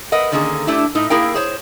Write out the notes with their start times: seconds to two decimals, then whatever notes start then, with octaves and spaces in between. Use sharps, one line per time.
0.12 A#4 B4 D#5 F#5
0.32 D3 D#3 A#3 C#4 G#4 A4
0.67 A3 D4 E4 G4
0.95 A2 D#4
1.10 A#3 E4 G#4 A#4 F5 G5
1.34 G#4 C5 C#5